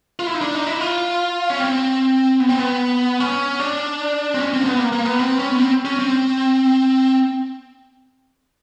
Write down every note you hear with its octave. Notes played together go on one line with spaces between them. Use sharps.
F4
E4
D#4
D4
D#4
E4
F4
C#4
C4
B3
C4
B3
C#4
D4
C4
C#4
C4
A#3
B3
A#3
A#3
B3
C4
C#4
B3
C4
C#4
C4